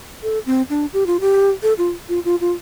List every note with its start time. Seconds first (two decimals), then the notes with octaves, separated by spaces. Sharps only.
0.23 A4
0.46 C4
0.70 D4
0.93 G4
1.06 F4
1.20 G4
1.63 A4
1.78 F4
2.09 F4
2.25 F4
2.41 F4